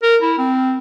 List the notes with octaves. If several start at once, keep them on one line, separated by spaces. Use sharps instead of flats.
A#4
E4
C4